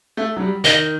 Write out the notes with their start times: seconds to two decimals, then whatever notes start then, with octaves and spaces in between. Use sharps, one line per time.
0.17 A3
0.36 F#3
0.40 G3
0.64 D#3 D#5